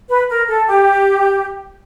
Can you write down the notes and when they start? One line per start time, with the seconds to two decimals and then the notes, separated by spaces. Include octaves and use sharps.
0.09 B4
0.29 A#4
0.47 A4
0.65 G4